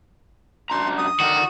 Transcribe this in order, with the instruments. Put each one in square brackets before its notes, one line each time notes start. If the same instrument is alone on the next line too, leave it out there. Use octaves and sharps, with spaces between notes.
[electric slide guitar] F#2 D4 A#5 [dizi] C6
[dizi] D#6
[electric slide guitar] D3 D#3 [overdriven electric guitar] F#4